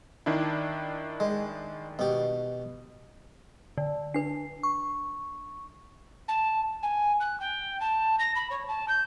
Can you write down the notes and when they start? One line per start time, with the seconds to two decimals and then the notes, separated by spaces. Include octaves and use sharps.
0.26 D#3 D4 E4
1.20 G#3
1.99 B2 G4
3.78 D3
4.14 D4 B4 C7
4.63 C#6
6.28 A5
6.83 G#5
7.20 F#6
7.40 G5
7.80 A5
8.19 A#6
8.35 B5
8.50 C#5
8.68 A5
8.88 G6